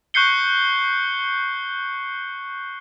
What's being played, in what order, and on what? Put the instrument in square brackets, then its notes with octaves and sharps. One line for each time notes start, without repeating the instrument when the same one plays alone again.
[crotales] C#6 F#6 G6 C7 C#7 G7